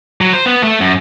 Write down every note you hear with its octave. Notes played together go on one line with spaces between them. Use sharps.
F#3
C5
B3
A3
F#2